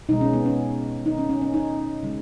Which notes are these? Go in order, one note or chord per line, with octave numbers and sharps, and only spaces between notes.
B2 G#3 D#4
C#4
B3
C#4
D#4
C#4
C#4
C#4
D#4
C#3 G#3